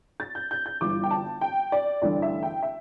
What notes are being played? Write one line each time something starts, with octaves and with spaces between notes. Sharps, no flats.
A6
G6
G6
G6
G1 G2 E3 D6
G5
A5
G5
D5
A1 G2 D3 D5
E5
G5
E5